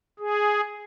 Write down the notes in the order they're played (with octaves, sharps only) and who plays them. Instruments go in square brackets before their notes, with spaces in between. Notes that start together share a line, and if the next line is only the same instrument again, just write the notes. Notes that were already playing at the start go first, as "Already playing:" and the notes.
[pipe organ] G#4